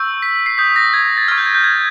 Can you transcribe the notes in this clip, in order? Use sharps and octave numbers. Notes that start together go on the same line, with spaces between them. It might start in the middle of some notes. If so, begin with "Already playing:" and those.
Already playing: C#6 E6 G6
B6
C7
D#6 G6 B6
A#6
G#6
G#6
A6
C#6 F6 G#6
G6
G#6
G6
G#6